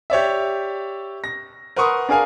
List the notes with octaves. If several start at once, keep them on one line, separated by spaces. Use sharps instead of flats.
G4 C#5 D5 E5
A#6
A#4 B4 F#5 C6 C#6 D#6
D4 G#4 A#4 F5 G#5